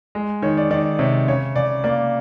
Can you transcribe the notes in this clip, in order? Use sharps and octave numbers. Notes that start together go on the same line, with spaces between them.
G#3
D#3 C#5
D5
D#3 D5
C3 C#5
C#3 C#5
C#3 D5
A#3 D5